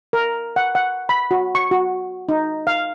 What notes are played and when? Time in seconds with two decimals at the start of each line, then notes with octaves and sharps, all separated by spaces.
0.13 A#4
0.56 F#5
0.75 F#5
1.09 B5
1.31 F#4
1.55 C#6
1.71 F#4
2.29 D#4
2.67 F5